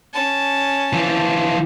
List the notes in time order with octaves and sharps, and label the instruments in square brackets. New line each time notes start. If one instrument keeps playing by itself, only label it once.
[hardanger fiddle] C#4 A5
[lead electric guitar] E3 F3